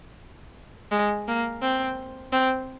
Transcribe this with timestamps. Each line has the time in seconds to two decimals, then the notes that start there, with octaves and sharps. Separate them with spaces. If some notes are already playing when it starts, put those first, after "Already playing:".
0.92 G#3
1.28 A#3
1.62 C4
2.32 C4